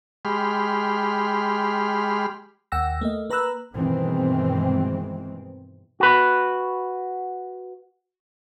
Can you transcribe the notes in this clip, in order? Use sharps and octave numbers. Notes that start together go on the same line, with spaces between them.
G#3 G4 B5 C6 F6
D#2 F#5 G5 E6 A#6
A3 A#3 D#5
A#3 B4 A#5 B5 E6 F#6
G2 B2 D#3 E3 G#3 C4
F#4 B4